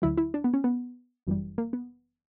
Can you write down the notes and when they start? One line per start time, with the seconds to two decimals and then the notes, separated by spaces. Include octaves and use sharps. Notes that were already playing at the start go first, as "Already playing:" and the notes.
0.02 D2 D3 F#3 E4
0.18 E4
0.34 D4
0.44 B3
0.54 C#4
0.64 B3
1.27 G1 F#2 E3 G3
1.58 A#3
1.73 B3